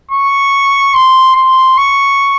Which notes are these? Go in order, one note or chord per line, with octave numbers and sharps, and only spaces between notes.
C#6
C6
C6
C#6